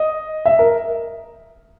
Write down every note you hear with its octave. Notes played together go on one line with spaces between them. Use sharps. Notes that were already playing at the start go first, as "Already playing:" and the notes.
Already playing: D#5
E5
A#4